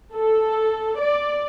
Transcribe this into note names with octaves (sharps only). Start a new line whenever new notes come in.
A4
D5